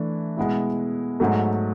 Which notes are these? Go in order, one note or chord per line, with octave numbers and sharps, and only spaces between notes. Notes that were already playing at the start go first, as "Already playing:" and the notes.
Already playing: E3 A3 D4
B2 G#3 B3 E4
G#2 F#3 A3